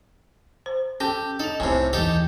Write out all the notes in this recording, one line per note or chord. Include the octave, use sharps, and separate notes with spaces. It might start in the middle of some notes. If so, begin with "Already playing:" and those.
C5
C#4 G4 A4 G5
D#4 A4 F7
C2 A2 C3 G#5
D#2 E3 D#4 G4 A4